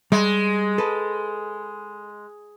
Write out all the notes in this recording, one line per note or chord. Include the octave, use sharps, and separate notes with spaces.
G3 G#3
A4 B4